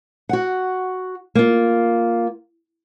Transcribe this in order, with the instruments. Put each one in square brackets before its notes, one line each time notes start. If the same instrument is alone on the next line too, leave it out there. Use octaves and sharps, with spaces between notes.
[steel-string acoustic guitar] F#4 F#5
A#3 F4